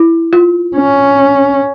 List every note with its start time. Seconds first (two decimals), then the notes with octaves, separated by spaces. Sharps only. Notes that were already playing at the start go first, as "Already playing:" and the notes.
Already playing: E4
0.33 F4
0.76 C#4